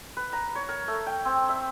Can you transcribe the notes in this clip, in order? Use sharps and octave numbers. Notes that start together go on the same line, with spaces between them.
B4
A#5
C#5
A#4
A3
G5
C4
E5